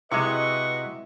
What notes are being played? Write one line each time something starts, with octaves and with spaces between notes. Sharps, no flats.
C3 G#3 E4 F#4 B4 D#5 C#6